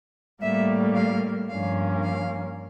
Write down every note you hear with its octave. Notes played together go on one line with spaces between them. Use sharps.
A2 G3 A#3 E5
F5
G2 F3 A#3 C#4 F5
F5